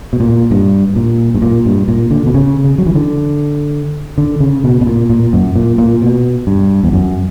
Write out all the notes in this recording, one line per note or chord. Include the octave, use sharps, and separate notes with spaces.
B2
A#2
G2
A#2
G2
A#2
G2
A#2
D3
B2
C#3
C#3
F#3
E3
D3
D3
C#3
B2
B2
A#2
A#2
F#2
A#2
A#2
B2
G2
E2
F#2